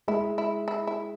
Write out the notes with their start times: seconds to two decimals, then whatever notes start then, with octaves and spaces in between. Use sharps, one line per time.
0.08 G#3 E4
0.38 E4
0.68 E4
0.87 E4